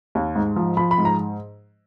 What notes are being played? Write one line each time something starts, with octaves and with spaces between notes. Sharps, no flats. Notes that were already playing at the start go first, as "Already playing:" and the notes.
D#2
G#2
F3
F3 B5
B5
G#2
A#5